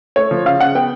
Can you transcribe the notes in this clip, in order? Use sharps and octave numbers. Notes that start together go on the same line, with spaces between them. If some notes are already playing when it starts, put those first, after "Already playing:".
A3 C#5
F3
C#3 F5
C#3 F#5
B3 G5